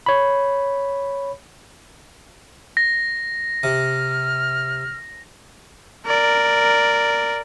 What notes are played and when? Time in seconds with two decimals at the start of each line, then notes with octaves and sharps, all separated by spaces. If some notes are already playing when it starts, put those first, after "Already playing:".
0.06 C#5 B5
2.77 A#6
3.63 C3 F6
6.06 A#4 D5